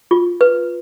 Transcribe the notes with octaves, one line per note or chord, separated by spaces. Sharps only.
F4
B4